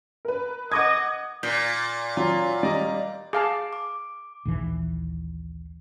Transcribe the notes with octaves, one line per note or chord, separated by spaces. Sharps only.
A#4 B4
D#5 F#5 D6 G#6
A#2 G6
F#3 F4
G3 D5 D#5 A#5
G#4 F5 A5 D6
D6
A#1 D#2 E3